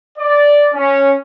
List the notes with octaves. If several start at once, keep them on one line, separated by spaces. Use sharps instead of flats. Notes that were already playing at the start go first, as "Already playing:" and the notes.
D5
C#4